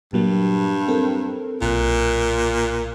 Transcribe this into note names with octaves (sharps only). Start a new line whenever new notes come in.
G2 A#2 F#3 A#3
C4 A4 A#4
B1 A#2 F#6